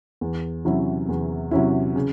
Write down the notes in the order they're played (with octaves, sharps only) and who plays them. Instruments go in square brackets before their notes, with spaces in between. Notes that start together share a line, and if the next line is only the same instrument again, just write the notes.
[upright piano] E2
C3 F#3 C#4 E4
E2
C3 F#3 C#4 E4
C#3